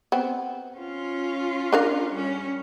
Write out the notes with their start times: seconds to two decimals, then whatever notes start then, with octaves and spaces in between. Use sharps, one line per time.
0.12 B3 C4
0.77 C#4 F4
1.73 D4 A#4 F5
2.11 G3 C#4